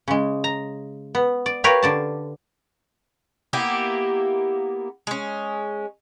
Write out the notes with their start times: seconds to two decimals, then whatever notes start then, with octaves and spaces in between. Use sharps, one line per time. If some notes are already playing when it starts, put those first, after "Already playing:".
0.08 C#3 G#3
0.44 A#5
1.15 B3
1.46 D5
1.64 G4 A#4 B4 C#5 F5
1.82 D3 D5 A5
3.53 A#3 B3 E4 G4
5.07 G#3 C#4